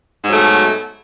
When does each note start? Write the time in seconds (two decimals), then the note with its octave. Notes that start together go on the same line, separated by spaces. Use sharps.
0.24 G#2
0.28 F#3
0.32 A3
0.36 B2